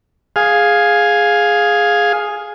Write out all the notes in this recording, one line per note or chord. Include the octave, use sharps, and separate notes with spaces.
G#4 F5